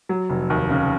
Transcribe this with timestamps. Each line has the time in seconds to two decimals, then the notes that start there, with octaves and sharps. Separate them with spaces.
0.09 F#3
0.30 F1
0.50 D#2
0.70 C#3